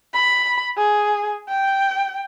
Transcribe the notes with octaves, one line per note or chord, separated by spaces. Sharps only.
B5
G#4
G5